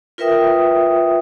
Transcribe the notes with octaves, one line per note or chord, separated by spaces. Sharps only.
F4 A#4 B4 E5 G5 D#6